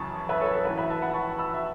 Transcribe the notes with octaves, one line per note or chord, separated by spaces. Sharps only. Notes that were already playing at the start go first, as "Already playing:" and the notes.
Already playing: F#2 C#3 E3 A5 C#6
B4 E5
A4 C#5
A4
A2 E3 B4
B4 E5
E5 A5
F#5 B5
A5 C#6
B5 E6
E5